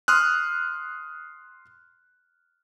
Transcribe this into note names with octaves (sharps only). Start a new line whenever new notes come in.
C6 D#6 F6 F#6